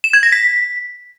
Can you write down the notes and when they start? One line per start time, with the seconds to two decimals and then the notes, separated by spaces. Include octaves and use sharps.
0.04 E7
0.13 G#6
0.23 A#6
0.32 B6